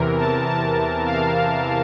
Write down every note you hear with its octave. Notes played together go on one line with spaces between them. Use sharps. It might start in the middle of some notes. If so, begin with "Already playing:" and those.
Already playing: E2 C3 E3 A#4
A5
A5
F5